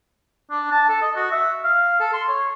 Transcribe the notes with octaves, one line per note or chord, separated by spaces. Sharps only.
D4
A5
A4
D#5
F#4
E5
F5
A4
C6
C#5